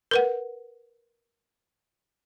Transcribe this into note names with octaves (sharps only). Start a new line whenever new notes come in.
A#4 B4 F#5